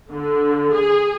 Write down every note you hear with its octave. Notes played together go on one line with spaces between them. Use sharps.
D3
G#4